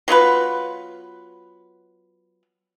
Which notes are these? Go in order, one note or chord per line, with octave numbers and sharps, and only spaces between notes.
F#3 B3 F4 B4